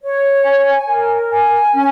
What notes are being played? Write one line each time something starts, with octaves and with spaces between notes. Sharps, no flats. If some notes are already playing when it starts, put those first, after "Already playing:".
C#5
G#5
A#4
G#5
C#4